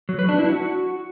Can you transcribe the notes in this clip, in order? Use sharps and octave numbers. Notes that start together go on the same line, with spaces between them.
F#3
B4
D4
E4
F#4